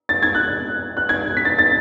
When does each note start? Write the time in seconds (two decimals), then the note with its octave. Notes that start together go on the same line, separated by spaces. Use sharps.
0.09 A6
0.23 G#6
0.35 F#6
0.97 F#6
1.09 G#6
1.37 B6
1.45 A6
1.59 A6